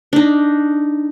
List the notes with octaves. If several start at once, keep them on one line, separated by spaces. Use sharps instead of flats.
D4 D#4